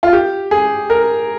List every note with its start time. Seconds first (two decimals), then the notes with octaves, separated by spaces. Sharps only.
0.03 F4
0.13 G4
0.51 G#4
0.90 A#4